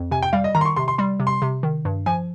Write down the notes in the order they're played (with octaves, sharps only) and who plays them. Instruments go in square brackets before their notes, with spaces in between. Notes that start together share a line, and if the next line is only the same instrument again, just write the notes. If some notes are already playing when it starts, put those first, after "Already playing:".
Already playing: [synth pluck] F2
[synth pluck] C3 [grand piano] G#5
[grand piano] G5
[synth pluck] G3 [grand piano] F5
[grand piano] D#5
[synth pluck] D#3 [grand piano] A#5
[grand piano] C6
C#6
[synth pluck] C3 [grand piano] C6
[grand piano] C6
[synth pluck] G3 [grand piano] C6
[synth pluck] C3
[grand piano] C6
[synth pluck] C3
D#3
G2
[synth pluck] F3 [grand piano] G#5